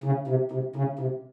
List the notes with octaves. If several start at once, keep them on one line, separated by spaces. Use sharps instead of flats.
C#3
C3
C3
C#3
C3